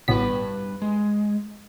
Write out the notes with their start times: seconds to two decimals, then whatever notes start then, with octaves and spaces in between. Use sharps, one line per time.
0.08 A1 G2 B2 B4 B6
0.82 G#3